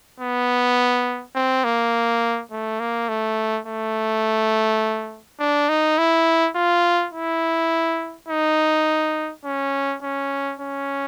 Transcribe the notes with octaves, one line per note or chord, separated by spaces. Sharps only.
B3
C4
A#3
A3
A#3
A3
A3
D4
D#4
E4
F4
E4
D#4
C#4
C#4
C#4